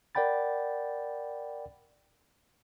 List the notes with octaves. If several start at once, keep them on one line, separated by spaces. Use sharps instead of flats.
A#4 D5 F#5 G5 B5 A6